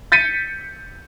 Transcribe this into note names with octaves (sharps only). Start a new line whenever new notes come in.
G6 A6 B6 C#7 D#7